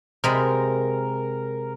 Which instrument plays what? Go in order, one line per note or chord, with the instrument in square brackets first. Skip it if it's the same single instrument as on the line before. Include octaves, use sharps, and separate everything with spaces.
[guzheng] C3 G#3 B5 [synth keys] A#4